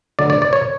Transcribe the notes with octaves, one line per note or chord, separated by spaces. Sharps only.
D2 D3 F#3 D5
D5
D5
C#5